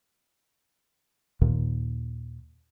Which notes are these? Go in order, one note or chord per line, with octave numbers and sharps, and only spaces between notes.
D#2 A#2 D#3